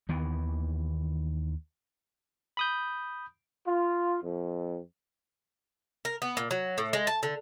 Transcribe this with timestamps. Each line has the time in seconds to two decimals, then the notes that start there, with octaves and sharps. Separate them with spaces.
0.09 D#2 D#3 E3 B3
2.57 B5 D#6 G6
3.67 F4
4.23 F2
6.05 A#4
6.22 B3
6.37 A#2
6.51 F#3
6.78 A2
6.93 G#3
7.07 A5
7.23 D3